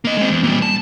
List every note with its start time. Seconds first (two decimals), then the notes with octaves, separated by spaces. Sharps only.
0.05 A#3 D#5
0.17 G#3 C4
0.30 E2
0.43 A#2 G3
0.62 A5